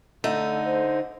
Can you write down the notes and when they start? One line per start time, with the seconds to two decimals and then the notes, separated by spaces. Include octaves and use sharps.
0.24 D3 A3 D#4
0.66 C5